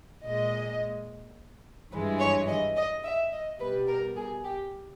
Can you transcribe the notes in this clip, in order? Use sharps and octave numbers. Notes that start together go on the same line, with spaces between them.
A#2 G#3 D#5
G2 E3 G#3 B4
C#5
D#5
D#5
E5
D#5
B2 G3 B4
A#4
G#4
G4